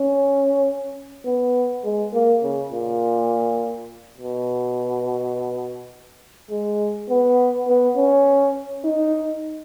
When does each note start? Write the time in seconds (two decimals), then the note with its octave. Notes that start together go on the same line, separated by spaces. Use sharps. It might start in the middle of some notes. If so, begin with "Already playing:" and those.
Already playing: C#4
1.26 B3
1.84 G#3
2.14 A#3
2.43 C#3
2.72 A#2
4.18 B2
6.51 G#3
7.10 B3
7.68 B3
7.96 C#4
8.85 D#4